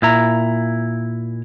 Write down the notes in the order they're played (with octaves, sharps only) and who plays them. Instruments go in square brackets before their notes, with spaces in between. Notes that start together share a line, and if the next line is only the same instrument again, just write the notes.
[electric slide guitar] A#2 E4 A#5